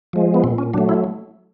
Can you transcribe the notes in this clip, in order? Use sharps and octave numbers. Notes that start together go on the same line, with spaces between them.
F3 G#3
B3
A#2 C4
C#4
F#3 A3 D4
E4